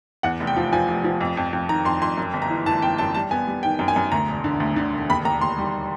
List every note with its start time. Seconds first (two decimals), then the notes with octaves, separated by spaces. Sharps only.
0.23 E2 F#5
0.40 F1
0.47 G5
0.56 F3
0.72 F3 G#5
0.88 F1
1.04 F3
1.21 F2
1.37 F2
1.53 F2
1.69 D#3 A#5
1.85 F2 C6
2.02 F2 C6
2.17 F#2
2.34 G1
2.42 A#5
2.50 E3
2.66 E3 A5
2.82 G1 G5
2.98 F#2 A5
3.14 G3 A5
3.31 B3 G#5
3.47 G3
3.63 D#3 G5
3.79 F#2
3.88 G#5
3.96 F#2
4.12 D2 A#5
4.28 E1
4.44 D3
4.60 D2
4.76 D3
4.93 E1
5.10 D#2 B5
5.25 D#2 A#5
5.41 D#2 C6
5.58 G3